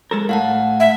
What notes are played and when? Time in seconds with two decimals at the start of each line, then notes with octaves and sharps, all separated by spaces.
0.11 G#3 A4 A#4
0.29 A2 F5 F#5 A5
0.80 E5